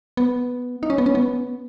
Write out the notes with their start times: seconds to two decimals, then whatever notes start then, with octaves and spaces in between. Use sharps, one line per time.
0.17 B3
0.83 D#4
0.90 C#4
0.98 B3
1.06 C#4
1.15 B3